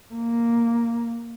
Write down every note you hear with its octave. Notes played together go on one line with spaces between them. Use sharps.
A#3